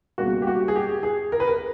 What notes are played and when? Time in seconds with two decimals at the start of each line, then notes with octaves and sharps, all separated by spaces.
0.18 C#2 B2 G3 A#3 F#4
0.42 G4
0.47 F#4
0.68 G#4
0.76 G4
1.03 G#4
1.32 A#4
1.40 B4
1.47 A#4